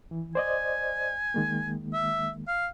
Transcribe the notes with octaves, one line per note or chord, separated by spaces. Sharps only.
E3
C5 D5 D#5 G#5
D#3 G#3 A#3
E5
F5